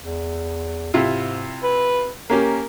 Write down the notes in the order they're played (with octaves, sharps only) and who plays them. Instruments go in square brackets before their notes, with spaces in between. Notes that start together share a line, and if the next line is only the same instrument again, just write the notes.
[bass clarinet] E2
[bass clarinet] G#2 [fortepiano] C3 E4 F4
[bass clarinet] B4
[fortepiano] A#3 C#4 G4 [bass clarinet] A#4